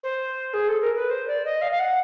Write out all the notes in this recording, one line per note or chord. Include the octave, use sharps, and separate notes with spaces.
C5
G#4
A4
A#4
B4
C5
D5
D#5
F5
F5
F#5